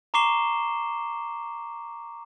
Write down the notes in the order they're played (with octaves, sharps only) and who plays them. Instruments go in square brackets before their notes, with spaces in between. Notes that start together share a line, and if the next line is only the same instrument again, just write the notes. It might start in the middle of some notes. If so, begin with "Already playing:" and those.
[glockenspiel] A#5 C#6 D6 C7 E7 G7